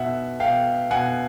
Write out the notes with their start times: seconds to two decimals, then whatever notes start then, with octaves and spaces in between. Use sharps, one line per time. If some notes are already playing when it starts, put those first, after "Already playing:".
Already playing: B2 E5 F#5
0.40 B2 F5 G5
0.91 B2 F#5 G#5